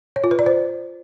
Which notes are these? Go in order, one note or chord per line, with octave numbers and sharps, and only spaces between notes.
C#5
F4
B4
D5
C5